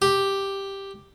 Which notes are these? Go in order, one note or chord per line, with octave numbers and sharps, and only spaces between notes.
G4